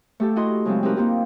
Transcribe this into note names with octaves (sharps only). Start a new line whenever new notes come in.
A3 G4 A4
E4 F#4 D#5 C6
C#3 F#3 G#3 A3 C4
C4 D#4 G4 A#4 B4
A#3 C4 D#4 F4 G4